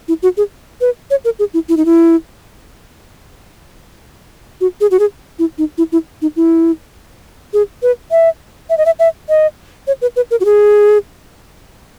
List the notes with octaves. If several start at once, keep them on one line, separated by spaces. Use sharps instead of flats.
E4
F#4
G#4
B4
C#5
A#4
G#4
E4
E4
D#4
E4
F#4
G#4
F#4
G#4
E4
D#4
E4
E4
D#4
E4
G#4
B4
E5
E5
D#5
E5
E5
D#5
C#5
B4
B4
A#4
F#4
G#4